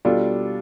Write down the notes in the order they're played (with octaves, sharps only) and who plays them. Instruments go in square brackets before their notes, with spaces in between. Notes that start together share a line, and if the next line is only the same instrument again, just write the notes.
[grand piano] B2 G3 D4 F4 A4